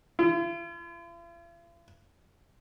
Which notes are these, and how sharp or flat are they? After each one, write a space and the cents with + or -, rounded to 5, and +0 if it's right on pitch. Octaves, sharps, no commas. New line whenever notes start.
F4 -45